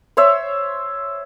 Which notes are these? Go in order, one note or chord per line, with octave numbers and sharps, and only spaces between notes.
C5 C#5 E5